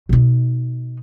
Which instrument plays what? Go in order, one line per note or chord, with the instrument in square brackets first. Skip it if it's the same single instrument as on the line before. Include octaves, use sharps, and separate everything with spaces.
[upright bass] B2 D#4